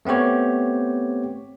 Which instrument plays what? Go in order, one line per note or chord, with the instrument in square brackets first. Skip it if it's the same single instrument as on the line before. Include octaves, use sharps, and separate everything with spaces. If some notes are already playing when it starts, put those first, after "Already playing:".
[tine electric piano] A3 B3 C4 G4 C#5